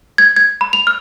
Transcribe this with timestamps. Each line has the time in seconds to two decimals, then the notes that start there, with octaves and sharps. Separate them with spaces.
0.18 G#6
0.36 G#6
0.61 B5
0.73 F7
0.87 F6